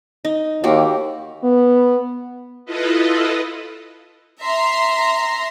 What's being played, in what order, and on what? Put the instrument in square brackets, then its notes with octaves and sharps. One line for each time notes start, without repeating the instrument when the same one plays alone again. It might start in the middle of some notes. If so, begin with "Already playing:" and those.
[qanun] D#4
[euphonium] D#2 [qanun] A#3 F#4 G4
[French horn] B3
[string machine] E4 F4 A4 B4 D#5
[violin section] E5 A#5 C6